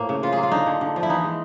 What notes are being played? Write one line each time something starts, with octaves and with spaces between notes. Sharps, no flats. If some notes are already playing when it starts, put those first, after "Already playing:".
Already playing: A2 F3 A#3
C#3
C#3 F4
G#4
A#3
F4
D3 D#4
D3
D3
F3
E4
E3 D#4
G#3